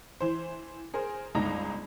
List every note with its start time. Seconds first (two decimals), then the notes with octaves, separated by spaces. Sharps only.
0.20 E3 C5
0.94 G#4 A#4 C5
1.35 G1 C#2 D#4 A#5 A#6